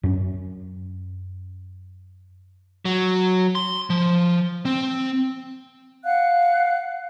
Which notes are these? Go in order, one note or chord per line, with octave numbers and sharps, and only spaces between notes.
F#2 C#4
F#3
C6
F3
C4
F5 F#5 F#6